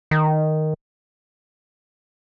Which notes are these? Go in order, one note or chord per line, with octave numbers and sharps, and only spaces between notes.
D#3